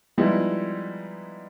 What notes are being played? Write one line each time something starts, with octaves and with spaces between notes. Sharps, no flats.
F3 G3 G#3 B3 D#4 E4